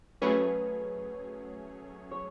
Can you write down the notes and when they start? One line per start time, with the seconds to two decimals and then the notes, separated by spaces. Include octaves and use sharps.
0.22 F#3 A3 C#4 G#4 B4 C#5
2.11 C#5